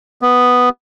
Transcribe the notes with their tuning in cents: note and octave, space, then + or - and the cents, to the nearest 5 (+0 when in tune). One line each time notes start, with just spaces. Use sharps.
B3 +0